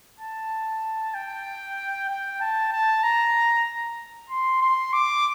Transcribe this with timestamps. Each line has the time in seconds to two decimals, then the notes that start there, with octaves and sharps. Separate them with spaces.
0.20 A5
1.14 G5
2.09 G5
2.41 A5
2.72 A5
3.03 A#5
4.30 C6
4.61 C6
4.93 D6